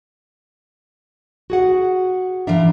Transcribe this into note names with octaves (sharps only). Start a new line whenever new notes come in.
F#4 G#4 F#5
E3 D4 E5 F5 A#5